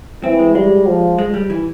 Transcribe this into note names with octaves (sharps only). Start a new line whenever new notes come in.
E3 C4
G#3
G3 G#3
F3
G#3
G3
E3